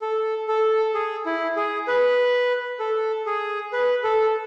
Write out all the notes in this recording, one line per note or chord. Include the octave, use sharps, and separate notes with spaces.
A4
A4
G#4
E4
G#4
B4
A4
G#4
B4
A4